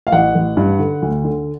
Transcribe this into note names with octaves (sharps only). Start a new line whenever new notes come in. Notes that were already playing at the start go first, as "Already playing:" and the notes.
F5
A1 F#5
A1
G2
D3
D2
D3